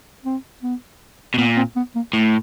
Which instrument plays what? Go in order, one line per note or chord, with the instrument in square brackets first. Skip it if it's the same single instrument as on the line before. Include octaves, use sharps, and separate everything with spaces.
[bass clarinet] C4
B3
[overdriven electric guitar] B2
[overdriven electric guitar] A#2 [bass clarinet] B3
[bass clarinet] C4
B3
A#3
[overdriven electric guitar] A2 [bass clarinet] A3